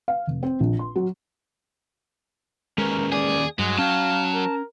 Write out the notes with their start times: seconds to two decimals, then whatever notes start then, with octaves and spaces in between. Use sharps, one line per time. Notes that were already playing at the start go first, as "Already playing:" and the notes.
0.08 F5
0.27 F1
0.43 C4
0.60 A#1
0.79 C6
0.96 F#3
2.78 D#2 G#3 C#4 A#4 B4
3.12 G#4 D5
3.59 G2 F#3 G#3
3.79 C#4 F5 G5 A5
4.34 A#4